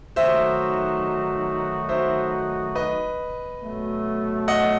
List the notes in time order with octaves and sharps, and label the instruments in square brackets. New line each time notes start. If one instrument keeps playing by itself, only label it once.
[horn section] D#3 F#3 A3 D#4 F#4 [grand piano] C5 E5
[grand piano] C5 E5
B4 D#5
[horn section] B2 F#3 A3
[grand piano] D#5 F#5